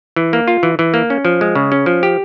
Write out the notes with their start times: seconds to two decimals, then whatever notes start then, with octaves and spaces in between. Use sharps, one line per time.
0.16 E3
0.33 A#3
0.48 F4
0.63 E3
0.79 E3
0.94 A#3
1.10 C#4
1.25 F3
1.41 G#3
1.55 C#3
1.72 C#4
1.86 F3
2.03 G4